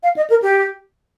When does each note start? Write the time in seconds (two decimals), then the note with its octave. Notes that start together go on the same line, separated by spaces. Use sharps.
0.03 F5
0.17 D#5
0.30 A#4
0.42 G4